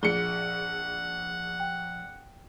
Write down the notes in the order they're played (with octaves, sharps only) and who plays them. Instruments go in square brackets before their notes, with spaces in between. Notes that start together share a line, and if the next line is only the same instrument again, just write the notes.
[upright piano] A#1 C#7 [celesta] G#4 G7 [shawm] F#5
[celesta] G5